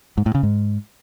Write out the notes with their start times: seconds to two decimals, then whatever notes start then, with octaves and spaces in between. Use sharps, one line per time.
0.17 G#2
0.26 A2
0.35 C#3
0.43 G#2